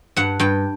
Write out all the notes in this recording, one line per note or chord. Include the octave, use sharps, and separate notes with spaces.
G2 F#5
G2 G5